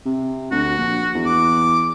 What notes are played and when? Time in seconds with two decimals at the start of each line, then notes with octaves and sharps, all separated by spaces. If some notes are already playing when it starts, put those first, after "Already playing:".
0.06 C3
0.51 D2 F#4
0.77 A#1
1.15 E2
1.26 D6